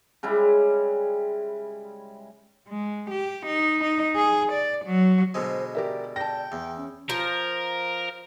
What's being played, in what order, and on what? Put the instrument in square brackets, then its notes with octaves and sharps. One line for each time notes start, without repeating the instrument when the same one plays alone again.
[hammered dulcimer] C#3 G3 G#3 E4
[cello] G#3
G4
D#4
D#4
G#4
D5
F#3
[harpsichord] B2 D3 G#3 [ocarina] C5
[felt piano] G4 A#4 E5 [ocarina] D5
[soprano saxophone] G5 [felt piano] A5 A#6
[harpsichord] E2
[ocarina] C#4
[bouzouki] F3 [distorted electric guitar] A#4